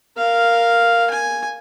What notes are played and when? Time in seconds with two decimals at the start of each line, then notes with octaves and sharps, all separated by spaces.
0.17 A#4 F5
1.10 G#5